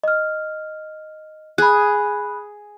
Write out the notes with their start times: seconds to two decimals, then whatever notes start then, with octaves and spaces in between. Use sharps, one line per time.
0.03 D#5 F6
1.58 G#4 B5 F#6